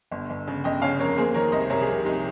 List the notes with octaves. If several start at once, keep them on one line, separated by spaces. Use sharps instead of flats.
G1
G1
C#3
G1 D#5 G5
C#3 C#5 F5
F2 A#4 C#5
A#3 G#4 C5
D#3 A#4 C#5
C2 C5 D#5
C2 A#4 C#5
G#4
C2 G4 A#4
C2 D#4 G4